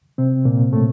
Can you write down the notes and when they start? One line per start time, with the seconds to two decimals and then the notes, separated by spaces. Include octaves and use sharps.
0.18 C3 C4
0.45 A#2 A#3
0.73 A2 A3